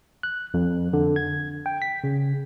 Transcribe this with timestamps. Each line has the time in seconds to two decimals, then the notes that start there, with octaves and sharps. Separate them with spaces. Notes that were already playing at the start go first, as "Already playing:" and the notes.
0.23 F#6
0.54 F2
0.93 D3
1.16 G#6
1.66 G5
1.82 B6
2.04 C#3